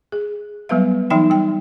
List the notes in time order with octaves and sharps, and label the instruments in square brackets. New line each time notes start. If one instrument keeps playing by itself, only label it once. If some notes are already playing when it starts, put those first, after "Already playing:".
[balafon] G#4
F#3 G3 B3 B4 E5 F5
E3 F#3 D#4 E5 G5 B5
G3 G5